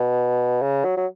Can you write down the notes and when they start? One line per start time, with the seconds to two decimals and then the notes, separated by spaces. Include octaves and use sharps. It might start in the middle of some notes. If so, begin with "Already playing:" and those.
Already playing: B2
0.62 C#3
0.85 F#3
0.97 F#3